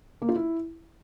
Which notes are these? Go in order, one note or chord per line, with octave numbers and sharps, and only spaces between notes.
A#3
F4
E4